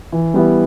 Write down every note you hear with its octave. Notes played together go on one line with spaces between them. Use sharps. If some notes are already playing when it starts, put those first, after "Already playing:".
E3
G3 B3 E4